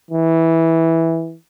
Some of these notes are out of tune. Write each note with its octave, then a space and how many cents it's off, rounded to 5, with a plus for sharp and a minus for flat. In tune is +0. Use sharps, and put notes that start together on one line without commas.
E3 -10